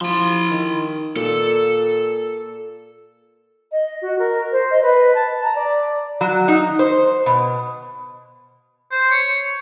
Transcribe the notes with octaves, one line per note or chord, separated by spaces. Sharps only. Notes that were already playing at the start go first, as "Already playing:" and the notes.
F3 E4 C6
D#3
A#2 A4
D#5
F#4
A#4
C5
D#5
B4
A5
A#5
D5
F#3
D#4
C5
B2
C5
C#5